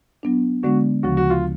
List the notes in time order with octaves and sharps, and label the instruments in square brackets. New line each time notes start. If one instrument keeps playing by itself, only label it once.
[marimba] F#3 B3 D4
[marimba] D3 G#3 B3 D4 [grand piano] F#4
[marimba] D2 C#3 F3 [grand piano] F#4
[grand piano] F#4
F4